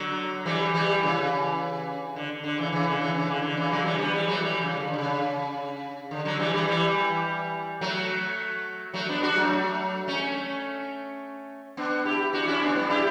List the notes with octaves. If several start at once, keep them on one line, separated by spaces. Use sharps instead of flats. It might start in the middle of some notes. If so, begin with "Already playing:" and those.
Already playing: D3 F#3
E3 G3
E3 G3
C#3 E3
D3
D3
C#3 E3
C#3 E3
D3
C#3 E3
C#3 E3
D3
D3
C#3 E3
D3 F#3
E3 G3
G3 B3
E3 G3
F#3 A3
E3 G3
C#3
D3
D3
C#3
D3
D3 F#3
E3 G3
E3 G3
E3 G3
F#3 A3
F#3 A3
B3 D4
D4 F#4
F#3 A3
A3 C#4
B3 D4
E4 G4
D4 F#4
C#4 E4
B3 D4
G3 B3
E4 G4